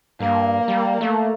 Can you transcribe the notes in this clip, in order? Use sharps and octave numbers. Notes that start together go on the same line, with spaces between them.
G2 A#3
G3
A3